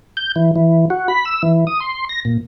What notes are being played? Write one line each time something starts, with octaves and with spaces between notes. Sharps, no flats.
G6
E3
E3
F#4
B5
E6
E3
D#6
C6
A#6
A#2